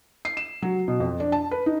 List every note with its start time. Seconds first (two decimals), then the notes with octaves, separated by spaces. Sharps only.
0.25 C7
0.37 E7
0.62 F#3
0.88 B2
1.00 F2
1.20 D4
1.32 A5
1.51 B4
1.66 D#4